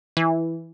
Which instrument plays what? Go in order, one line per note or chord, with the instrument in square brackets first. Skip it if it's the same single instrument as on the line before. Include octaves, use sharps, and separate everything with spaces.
[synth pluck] E3